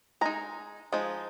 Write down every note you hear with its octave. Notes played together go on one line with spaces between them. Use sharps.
G#3 D#4 A#5
F3 G#3 D#4